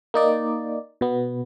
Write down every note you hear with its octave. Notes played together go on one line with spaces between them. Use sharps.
A#3 D#4 D5
B2 B3